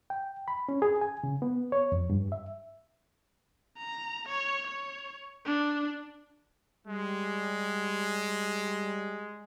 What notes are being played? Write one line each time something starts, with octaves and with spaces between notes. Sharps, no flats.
G5
B5
C#4
G#4
G#5
C#3
B3
C#5
F2
G2
E5
A#5
C#5
C#5
D4
G3 G#3